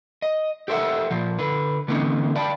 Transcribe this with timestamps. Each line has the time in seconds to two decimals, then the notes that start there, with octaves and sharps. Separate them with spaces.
0.22 D#5
0.68 G4 A4 C5 D5 E5 F#5
1.11 A#2 F3
1.39 D3 B4
1.88 D3 E3 A#3 C4 C#4 D#4
2.36 D5 F5 G5 A5 B5